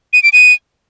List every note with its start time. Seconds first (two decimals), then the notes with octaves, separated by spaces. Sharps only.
0.13 D#7
0.23 D7
0.33 D#7